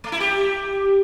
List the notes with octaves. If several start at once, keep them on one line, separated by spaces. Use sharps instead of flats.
A3
E4
G4